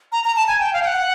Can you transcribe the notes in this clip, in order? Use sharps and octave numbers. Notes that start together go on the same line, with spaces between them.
A#5
A#5
A5
G#5
G5
F5
G5
F#5